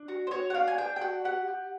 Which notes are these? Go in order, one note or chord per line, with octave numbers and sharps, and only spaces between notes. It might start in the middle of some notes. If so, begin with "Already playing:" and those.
Already playing: D4
F#4
C5
F#4 C#5
F#5
D4 F5
G#5
D4 G5
G5
F#4 F#5
G4 F#5
G4